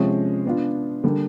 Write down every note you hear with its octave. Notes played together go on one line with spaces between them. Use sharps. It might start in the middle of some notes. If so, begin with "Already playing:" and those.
Already playing: C3 F3 G#3 C#4
B3 D4 F4
D3 G3 A#3